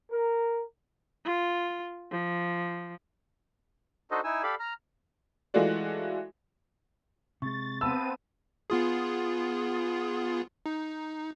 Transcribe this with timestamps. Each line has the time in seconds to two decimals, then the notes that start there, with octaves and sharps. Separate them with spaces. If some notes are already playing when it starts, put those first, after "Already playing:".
0.11 A#4
1.25 F4
2.11 F3
4.11 D4 D#4 F#4 A4 C5 D#5
4.24 D#4 E4 G#5 E6
4.43 G4 A4 D5 F5 B5
4.60 A#5 F6
5.54 E3 G#3 A3 F4 F#4 D5
7.42 C3 G#3 C#6 A6
7.81 B3 C4 F5 A5 B5 E6 D#7
8.70 B3 F4 G#4
10.66 D#4